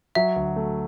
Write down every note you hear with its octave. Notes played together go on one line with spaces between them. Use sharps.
F#3 E5
D2
A3